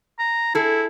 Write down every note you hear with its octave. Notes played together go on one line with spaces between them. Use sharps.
A#5
E4 G#4 A4